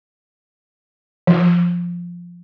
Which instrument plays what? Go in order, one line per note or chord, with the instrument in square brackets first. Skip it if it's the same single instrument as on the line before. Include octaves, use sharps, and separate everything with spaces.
[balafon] F3